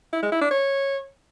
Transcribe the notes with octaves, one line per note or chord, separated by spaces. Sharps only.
E4
G#3
E4
D4
C#5